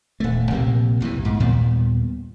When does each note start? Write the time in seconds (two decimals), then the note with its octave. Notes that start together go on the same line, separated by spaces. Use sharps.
0.20 D#1 A3
0.51 A#1 C3 G3 A#3
1.00 B1 E2 C3 E3
1.25 G#2
1.40 D#2 A#2 G3 B3